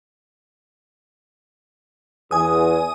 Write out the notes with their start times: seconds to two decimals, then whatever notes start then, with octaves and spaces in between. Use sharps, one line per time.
2.31 E2 G#5 D#6